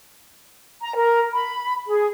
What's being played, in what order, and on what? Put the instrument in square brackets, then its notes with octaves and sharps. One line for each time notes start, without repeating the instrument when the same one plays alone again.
[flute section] A#5
A#4
B5
G#4